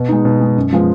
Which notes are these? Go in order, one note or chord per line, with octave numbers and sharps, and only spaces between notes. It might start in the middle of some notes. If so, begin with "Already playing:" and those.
Already playing: B2
G#3 D#4
B2
G#3 D#4
F#2
F3 G#3 B3 F4